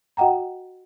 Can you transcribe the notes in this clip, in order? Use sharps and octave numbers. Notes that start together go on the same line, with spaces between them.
F#4 D#5 F#5 G5 A#5